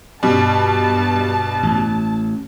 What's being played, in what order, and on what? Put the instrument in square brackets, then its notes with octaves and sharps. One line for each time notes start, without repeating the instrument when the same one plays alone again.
[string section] G2 [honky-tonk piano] B2 G3 [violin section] A5
[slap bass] A1